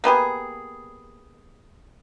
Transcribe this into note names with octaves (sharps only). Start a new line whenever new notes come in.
A#3 B3 G4 G#4